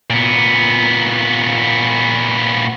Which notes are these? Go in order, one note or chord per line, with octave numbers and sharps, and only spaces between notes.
A#2 B3